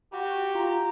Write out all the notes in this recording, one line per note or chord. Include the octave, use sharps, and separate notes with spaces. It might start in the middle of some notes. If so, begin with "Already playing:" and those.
F#4 G4
F4 A#5